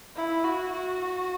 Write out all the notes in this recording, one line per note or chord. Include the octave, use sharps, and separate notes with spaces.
E4
F#4
F#4